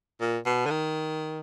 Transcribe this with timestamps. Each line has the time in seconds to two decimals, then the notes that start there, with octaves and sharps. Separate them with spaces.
0.21 A#2
0.46 B2
0.66 D3
0.71 D#3